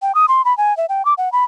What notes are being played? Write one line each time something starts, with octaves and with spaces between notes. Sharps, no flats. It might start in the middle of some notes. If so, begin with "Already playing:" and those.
G5
D#6
C6
B5
G#5
E5
G5
D6
F#5
B5